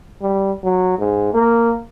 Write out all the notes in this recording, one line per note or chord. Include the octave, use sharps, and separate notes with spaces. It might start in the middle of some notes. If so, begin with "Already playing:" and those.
G3
F#3
G#2
A#3